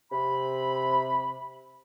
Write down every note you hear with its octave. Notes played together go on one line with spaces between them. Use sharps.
C3 B5